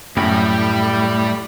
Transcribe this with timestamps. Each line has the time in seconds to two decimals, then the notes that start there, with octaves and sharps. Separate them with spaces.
0.17 F#2 A2 G3 G5 B5